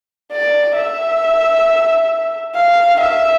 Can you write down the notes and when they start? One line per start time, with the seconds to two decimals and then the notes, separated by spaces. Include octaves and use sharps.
0.32 D5
0.76 E5
2.55 F5
3.00 E5